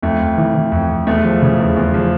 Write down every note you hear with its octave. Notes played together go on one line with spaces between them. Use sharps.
F2 A3
F2
E3
E3
F2
F2
E2 A3
F3
C#3
E2
E2
F3